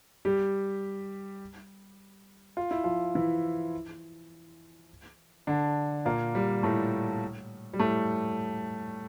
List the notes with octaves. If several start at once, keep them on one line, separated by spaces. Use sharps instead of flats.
G3 G4
F4
E4
F3 F4
E3 E4
D3 D4
A#2 A#3
G3
A2 A3
G3
A2 A3